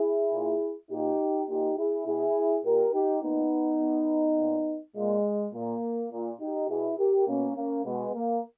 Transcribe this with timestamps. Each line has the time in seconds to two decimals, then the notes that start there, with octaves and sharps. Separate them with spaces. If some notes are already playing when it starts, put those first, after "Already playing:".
Already playing: E4 G#4
0.33 A#2
0.91 A#2 D#4 G4
1.49 A#2 D#4 G4
1.78 E4 G#4
2.07 B2 E4 G#4
2.64 A#2 G4 A#4
2.94 D#4 G4
3.22 A#2 B3 D#4
3.81 B2
4.38 A#2
4.96 A#2 G#3
5.54 A#2 A#3
6.12 A#2
6.41 D#4 G4
6.70 B2 E4 G#4
6.98 G4 A#4
7.27 B2 A#3 C#4
7.56 A#3 C#4
7.85 B2 G#3 B3
8.14 A#3